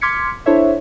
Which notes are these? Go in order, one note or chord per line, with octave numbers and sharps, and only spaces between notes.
C6 D6 F6 G#6 B6 C#7
D4 E4 A4 C5 C#5 E5